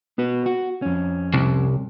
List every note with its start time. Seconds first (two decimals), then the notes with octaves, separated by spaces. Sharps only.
0.18 B3 F#4 B4
0.46 F#4
0.82 F2 C#4
1.33 C2